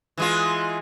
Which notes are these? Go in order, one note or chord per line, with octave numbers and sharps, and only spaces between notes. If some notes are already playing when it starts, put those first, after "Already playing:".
E3 G#3 F4